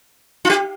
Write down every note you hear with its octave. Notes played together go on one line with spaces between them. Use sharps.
F4
G4